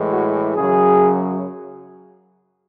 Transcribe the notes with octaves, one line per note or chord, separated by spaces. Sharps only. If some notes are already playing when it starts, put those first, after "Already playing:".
Already playing: A2 E3 G#3
F#4
F#2 C#3 F#3 G#4